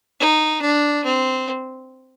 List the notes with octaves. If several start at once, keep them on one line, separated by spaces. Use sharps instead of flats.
D#4
D4
C4